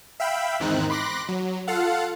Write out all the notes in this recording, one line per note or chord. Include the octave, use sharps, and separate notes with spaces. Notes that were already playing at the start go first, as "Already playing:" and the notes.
E5 F5 G5 B5
E2 G#2 D#3 C4 D#4 F#6
B5 C6 D6 F#6 A#6
F#3
F4 A4 F5 F#5